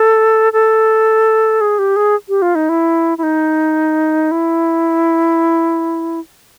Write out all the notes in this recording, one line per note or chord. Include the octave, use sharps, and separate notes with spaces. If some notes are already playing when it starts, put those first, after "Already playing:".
Already playing: A4
A4
G#4
G4
G#4
G4
F4
D#4
E4
E4
D#4
E4